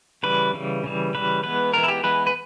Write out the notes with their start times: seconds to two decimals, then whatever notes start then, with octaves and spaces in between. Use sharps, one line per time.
0.23 C#3 E3 G3 B4
0.53 C#3 E3 G3
0.84 C#3 E3 G3
1.14 C#3 E3 G3 B4
1.43 E3 G#3 B3 B4
1.73 E3 G#3 B3 A#4
1.83 E4
1.88 G4
2.03 E3 G#3 B3 B4
2.27 B4